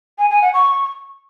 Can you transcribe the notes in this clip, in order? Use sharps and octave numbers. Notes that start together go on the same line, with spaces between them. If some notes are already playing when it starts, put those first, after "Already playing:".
G#5
G#5
F#5
C#6